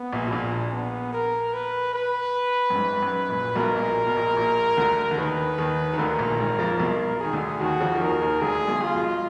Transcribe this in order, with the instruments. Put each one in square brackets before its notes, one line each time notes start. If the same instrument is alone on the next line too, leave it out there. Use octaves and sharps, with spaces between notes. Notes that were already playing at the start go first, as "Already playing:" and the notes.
Already playing: [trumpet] B3
[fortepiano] A#1 A#2
B2
[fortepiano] A#1 A#2 [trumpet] D4
[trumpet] B3
A#4
B4
B4
[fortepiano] F#2
G#1 G#2
F#2
A#1 A#2
[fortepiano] B1 B2 [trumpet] A#4
[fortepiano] A#1 A#2
B2
A#1 A#2
A#1 A#2
D2 D3
D3
[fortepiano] D#2 D#3 [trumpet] B4
[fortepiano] D#2 D#3
D#3
[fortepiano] D2 D3 [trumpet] A#4
[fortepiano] A#1 A#2
G#1 G#2
F2 F3
[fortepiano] B1 B2 [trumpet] A#4
[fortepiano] D#3 [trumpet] G#4
[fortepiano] D2 D3
[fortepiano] D#2 D#3 [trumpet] F#4
[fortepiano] F2 F3
F3
[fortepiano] D#2 D#3 [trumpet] A#4
[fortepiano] D#2 D#3
[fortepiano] D2 D3 [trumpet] G#4
[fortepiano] B1 B2
[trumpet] F4
[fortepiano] B1 B2